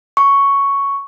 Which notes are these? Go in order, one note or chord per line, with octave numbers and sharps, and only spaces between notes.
C#6